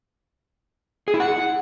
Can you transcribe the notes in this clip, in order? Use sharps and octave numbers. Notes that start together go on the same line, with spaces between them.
G#4
E4
F#5